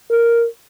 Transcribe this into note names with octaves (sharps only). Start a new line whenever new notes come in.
A#4